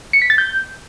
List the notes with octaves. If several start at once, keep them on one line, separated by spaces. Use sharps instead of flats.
C#7
B6
A6
G6